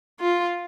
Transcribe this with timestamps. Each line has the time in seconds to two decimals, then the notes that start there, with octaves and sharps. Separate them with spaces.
0.20 F4